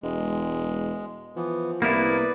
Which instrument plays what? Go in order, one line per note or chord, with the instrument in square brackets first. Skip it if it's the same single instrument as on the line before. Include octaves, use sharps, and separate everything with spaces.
[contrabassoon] E1 [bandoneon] G#3
[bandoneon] E3 B3 [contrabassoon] F3
[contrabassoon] C2 [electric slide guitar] A#3 E4 [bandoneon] B3 B4 D5